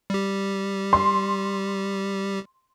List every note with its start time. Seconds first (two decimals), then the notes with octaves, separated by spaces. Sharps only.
0.10 G3 G4
0.93 C6